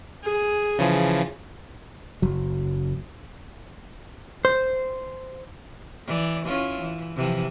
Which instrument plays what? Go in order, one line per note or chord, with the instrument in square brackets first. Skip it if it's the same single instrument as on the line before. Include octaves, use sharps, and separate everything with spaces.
[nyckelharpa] G#4
[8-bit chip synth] C#3 E3 F3
[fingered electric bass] F#1 F#3
[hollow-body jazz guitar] C5
[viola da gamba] E3 D5
C#4 E4 F4
E3
C3 E3 F3